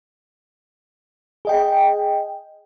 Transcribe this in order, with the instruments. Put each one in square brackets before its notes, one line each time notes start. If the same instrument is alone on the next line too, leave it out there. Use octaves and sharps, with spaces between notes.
[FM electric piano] G#4 D#5 G5